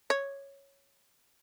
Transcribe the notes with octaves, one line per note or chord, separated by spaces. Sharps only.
C#5